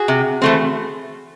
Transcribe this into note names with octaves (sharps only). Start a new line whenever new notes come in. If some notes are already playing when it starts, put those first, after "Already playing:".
Already playing: F#4 G#4
C3
E3 A3 C4